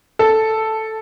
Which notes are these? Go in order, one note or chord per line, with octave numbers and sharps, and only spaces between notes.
A4